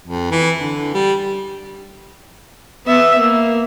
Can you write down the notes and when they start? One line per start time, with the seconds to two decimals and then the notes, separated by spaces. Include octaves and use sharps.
0.08 F2
0.31 E3
0.60 D3
0.94 G3
2.87 B3 E5
3.18 A#3